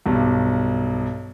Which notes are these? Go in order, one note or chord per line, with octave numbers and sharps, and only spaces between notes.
B1 G2